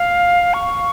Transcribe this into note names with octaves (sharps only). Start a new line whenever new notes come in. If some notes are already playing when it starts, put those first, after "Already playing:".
Already playing: F5
C#6